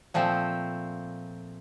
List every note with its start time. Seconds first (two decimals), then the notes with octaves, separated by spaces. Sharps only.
0.14 A#2 F3 A3 C4